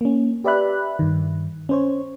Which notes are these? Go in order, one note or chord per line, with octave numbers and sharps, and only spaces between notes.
A#3 C#4
G4 B4 D5 E5 B5 F#6
G2 D#3
C#4 C5 C#5